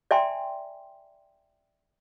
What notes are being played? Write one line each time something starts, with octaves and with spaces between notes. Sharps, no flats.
D5 E5 G5 G#5 A#5 C6